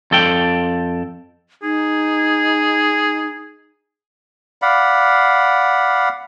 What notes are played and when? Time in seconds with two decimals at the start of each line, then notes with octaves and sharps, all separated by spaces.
0.11 F2 A4 G5
1.63 D#4 G#4
4.62 D5 F5 F#5 B5